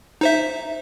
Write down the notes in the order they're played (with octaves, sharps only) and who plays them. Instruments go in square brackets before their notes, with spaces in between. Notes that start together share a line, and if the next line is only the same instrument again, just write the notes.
[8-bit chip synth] D#4 C5 E5